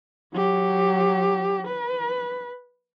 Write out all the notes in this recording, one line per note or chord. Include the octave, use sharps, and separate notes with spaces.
F#3 G4
B4